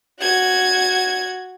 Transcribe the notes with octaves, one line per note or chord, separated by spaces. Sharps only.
F#4 G#6